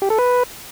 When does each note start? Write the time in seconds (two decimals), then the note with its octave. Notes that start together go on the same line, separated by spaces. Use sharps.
0.02 G4
0.10 A4
0.19 B4